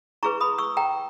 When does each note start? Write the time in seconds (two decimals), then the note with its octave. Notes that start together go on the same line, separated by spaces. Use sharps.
0.23 E4 G#4 B4 A#5 C#6
0.41 B5 D#6
0.58 C#6 E6
0.77 G5 A#5